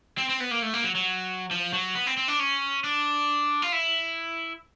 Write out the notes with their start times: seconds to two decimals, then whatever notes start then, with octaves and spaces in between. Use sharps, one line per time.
0.18 C4
0.29 C4
0.40 B3
0.51 A#3
0.62 A3
0.74 A#3
0.84 F#3
0.95 F#3
1.51 F3
1.73 F#3
1.95 B3
2.07 C4
2.17 C4
2.28 D4
2.39 C#4
2.84 D4
3.62 F4
3.72 E4